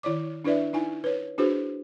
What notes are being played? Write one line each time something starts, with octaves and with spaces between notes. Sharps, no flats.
D#3 E4 C#5 D5 D6
D4 E4 B4 D5 E5
D#4 E4 G#5
B4 C#5
D4 E4 F#4 G#4 B4 C5